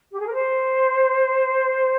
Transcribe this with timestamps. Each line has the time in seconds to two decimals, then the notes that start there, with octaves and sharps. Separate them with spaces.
0.12 G4
0.20 G#4
0.26 A#4
0.33 C5